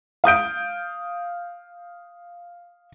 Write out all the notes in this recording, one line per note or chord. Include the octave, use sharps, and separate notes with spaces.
F5 D#6 G6 D7